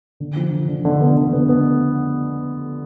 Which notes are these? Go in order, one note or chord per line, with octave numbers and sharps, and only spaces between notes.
D3
F3
D3
D3
D3
B3
D3
B3
B3